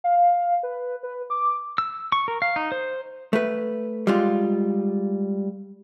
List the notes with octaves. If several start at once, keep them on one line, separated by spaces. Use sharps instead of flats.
F5
B4
B4
D6
E6
C#6
A#4
F5
D#4
C5
A3 B4
G3 G#3 F4